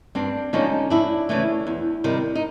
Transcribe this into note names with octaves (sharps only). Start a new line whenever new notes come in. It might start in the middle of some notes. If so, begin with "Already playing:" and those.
G2 C4 D4
D3 F3 G#3 C#4 D#4
F2 D4 E4
C#3 E3 A3
E2
C3 D#3 G3
D#4